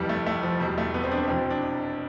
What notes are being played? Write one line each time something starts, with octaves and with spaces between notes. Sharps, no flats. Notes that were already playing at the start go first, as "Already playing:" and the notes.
Already playing: F1 F2 E3 G3
A3
A3
F3
E1 E2 B2 G3
A3
B3
C4
D4
F1 E2 B2 C4
D4